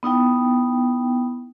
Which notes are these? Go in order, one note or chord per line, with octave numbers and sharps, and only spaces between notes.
B3 D#4 E4 G5